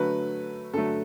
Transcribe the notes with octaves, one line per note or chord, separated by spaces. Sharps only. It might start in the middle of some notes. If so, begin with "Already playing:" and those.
Already playing: D3 F#3 A3 B4
D3 F#3 A3 A4